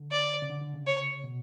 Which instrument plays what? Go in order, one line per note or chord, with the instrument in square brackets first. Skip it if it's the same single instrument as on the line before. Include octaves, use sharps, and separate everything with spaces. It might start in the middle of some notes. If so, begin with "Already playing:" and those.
Already playing: [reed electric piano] D3
[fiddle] D5
[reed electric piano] C#3
D3
D3
C#3
[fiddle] C#5
[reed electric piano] B2